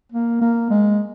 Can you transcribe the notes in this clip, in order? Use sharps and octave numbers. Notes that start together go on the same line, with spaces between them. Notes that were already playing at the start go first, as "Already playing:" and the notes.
A#3
A#3
G#3